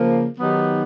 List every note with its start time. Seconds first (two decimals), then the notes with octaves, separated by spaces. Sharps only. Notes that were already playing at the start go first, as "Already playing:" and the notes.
Already playing: C#3 F3 A#3
0.38 D#3 F#3 B3 D#4 G4